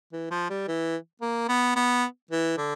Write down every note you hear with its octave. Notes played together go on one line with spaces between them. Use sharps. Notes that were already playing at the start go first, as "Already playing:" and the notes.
E3
F3
G3
E3
A#3
B3
B3
E3
D3